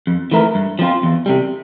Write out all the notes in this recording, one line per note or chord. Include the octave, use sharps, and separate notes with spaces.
F2
E3 A3 E4 A#4
G2
F3 C4 F4
E2
C3 G3